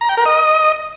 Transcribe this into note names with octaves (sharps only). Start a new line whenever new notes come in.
A#5
G5
A#4
D#5